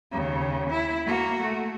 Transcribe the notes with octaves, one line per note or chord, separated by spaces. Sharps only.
D#2 C#3
E4
A#3 F#4
A3